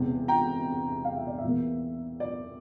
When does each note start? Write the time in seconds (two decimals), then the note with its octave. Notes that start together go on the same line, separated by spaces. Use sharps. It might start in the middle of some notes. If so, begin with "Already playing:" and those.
Already playing: E1 E2 C3
0.28 G5 A#5
1.05 F5
1.16 E5
1.27 D5
1.38 E5
1.44 E2 E3 A#3
2.20 D5